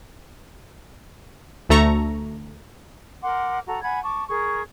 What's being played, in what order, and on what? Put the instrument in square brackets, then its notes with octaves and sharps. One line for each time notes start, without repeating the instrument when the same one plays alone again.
[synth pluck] D2 A3 A4 A#5 C#6
[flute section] A#4 F#5 C6 D6
F#4 A4 A#5
F#5 G#5 B5 G#6
A5 C#6 D6
G#4 A#4 C#6